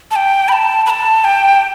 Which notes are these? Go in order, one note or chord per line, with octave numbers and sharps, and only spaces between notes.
A5
G5
B5
A5
B5
A5
G5